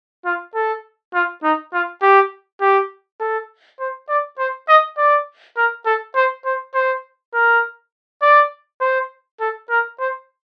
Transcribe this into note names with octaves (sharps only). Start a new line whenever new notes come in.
F4
A4
F4
D#4
F4
G4
G4
A4
C5
D5
C5
D#5
D5
A#4
A4
C5
C5
C5
A#4
D5
C5
A4
A#4
C5